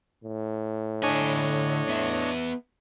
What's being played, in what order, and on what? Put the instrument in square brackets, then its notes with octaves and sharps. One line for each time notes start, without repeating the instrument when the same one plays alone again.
[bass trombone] A2
[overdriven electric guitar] D3 G#5 [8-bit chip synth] D4 C#5 D#5
[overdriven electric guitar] B3 E5